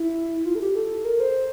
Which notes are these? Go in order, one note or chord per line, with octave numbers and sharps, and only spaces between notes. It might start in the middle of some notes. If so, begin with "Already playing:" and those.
Already playing: E4
F4
A4
G4
A4
A#4
C5